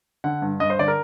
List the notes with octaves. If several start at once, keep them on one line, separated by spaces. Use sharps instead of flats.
D3 F#5
G2
G2 D#5
C5
D3 D5
A#4